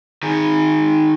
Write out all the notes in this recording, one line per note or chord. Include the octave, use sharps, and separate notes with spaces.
D#3 G#4